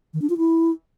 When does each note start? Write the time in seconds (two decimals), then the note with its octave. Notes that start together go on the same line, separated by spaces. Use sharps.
0.14 D#3
0.22 D4
0.30 F4
0.38 E4